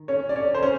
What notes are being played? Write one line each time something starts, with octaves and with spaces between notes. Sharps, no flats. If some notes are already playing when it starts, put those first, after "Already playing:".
Already playing: D#3
C#4 C#5
D5
C#4 C#5
C5
C#4